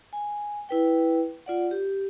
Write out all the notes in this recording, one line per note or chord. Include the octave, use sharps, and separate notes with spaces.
G#5
E4 B4 G5
F4 D5 F#5
G4